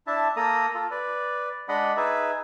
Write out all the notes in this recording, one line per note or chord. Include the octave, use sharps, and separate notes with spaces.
D4 E4 E5 A5
A#3 A4 A#5 D#6
F4 A4
B4 D5
G#3 D4 D5 D#5 F#5 B5
D#4 G#4 B4 E5